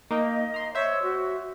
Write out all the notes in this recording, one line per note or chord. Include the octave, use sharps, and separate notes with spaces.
A#3 D#4 D#5 G5
A#5 C6
C5 C#5 E5
F#4